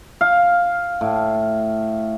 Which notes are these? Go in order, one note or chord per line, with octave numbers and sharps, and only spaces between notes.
F5
A2